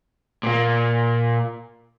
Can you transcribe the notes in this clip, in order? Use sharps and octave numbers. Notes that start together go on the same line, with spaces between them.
A#2 A#3